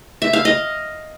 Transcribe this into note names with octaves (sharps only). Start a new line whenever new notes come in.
E5
F5
D#5